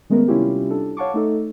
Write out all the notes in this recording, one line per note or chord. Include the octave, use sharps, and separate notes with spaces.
D#3 G#3 A3 B3 C#4 A#4
C3 G3 C#4 E4 F4 G4
D4 A4
C#5 F5 F#5 A5 C#6 D6
A3 D#4 A4